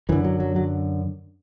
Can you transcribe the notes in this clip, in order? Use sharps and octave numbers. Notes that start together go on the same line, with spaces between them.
F#2 D3 E3
F#3
F#3
F#3